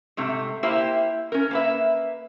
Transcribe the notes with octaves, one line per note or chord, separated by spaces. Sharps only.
G#2 C3 A3
A#3 E4 G4 C5 E5
C#4 A#4
A#3 B4 E5